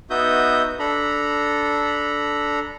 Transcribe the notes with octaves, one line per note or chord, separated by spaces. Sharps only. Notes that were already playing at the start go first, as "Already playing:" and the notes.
B3 D#4 F#4 E5 D#6 G6
D4 A4 A#5 B5